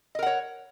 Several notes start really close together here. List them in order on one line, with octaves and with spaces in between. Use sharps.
D#5 A#4 F#5 C#5